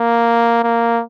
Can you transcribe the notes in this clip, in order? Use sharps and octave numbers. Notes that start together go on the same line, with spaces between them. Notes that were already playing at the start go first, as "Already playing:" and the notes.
Already playing: A#3
A#3